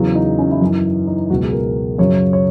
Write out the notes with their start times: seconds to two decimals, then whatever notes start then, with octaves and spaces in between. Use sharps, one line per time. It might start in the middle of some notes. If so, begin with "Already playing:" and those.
Already playing: E2 C#3 F#3
0.15 D#4
0.39 C#4
0.51 E4
0.61 F#2 E3 D#4
1.07 D#4
1.30 C#2 B2 F#3 F#4
1.44 G#4
1.53 A#4
1.98 F#2 C#3 F#3 C#5
2.33 C#5